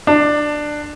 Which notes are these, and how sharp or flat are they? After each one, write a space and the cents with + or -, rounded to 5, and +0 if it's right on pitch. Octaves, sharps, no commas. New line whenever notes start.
D4 +15